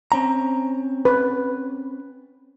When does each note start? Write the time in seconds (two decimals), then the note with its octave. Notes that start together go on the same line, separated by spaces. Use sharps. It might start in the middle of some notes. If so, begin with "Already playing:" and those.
0.12 C4 C#4 A#5
1.05 B4